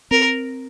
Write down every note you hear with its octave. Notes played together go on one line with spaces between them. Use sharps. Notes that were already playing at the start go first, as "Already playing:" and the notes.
C4 A#4